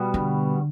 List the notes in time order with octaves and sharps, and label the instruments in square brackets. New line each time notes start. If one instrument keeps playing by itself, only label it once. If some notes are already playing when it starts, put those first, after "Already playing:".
Already playing: [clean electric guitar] B2 G3 B3 F#4
[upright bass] D3